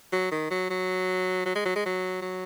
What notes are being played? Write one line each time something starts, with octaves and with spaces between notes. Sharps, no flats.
F#3
D#3
F#3
F#3
F#3
G#3
F#3
G#3
F#3
F#3